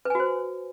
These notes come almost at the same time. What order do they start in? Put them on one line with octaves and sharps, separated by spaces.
B4 G#5 F#4 C5